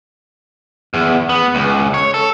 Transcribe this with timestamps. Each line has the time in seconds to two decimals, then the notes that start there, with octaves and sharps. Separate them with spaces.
0.94 E2
1.29 B3
1.55 C#2
1.94 C#5
2.14 A4